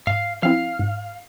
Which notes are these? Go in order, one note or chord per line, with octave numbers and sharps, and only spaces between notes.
G#2 F5
F3 C4 E4 F5
G#2